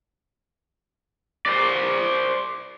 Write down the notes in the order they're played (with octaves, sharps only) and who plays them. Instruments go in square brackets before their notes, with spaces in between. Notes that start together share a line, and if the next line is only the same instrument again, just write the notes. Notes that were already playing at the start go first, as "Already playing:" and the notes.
[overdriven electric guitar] C5 D5